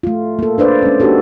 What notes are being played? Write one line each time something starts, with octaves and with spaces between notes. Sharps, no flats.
A3 F4
A#3 A4
D4 B4 C5 D5
G#3 C#4
A#3 D4 D#4 F#4 G4 A4